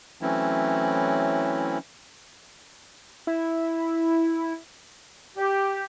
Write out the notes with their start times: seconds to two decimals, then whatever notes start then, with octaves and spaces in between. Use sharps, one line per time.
0.22 E3 F#3 A3 C4 C#4 E4
3.27 E4
5.37 G4